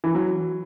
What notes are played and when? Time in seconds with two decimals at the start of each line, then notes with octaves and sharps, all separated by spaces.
0.04 E3
0.15 F#3